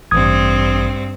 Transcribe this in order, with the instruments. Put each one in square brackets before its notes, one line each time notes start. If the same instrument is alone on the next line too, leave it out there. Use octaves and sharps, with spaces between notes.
[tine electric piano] A1 D#6 G#6 [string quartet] G2 C4